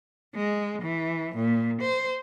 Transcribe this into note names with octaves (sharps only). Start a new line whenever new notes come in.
G#3
E3
A#2
C5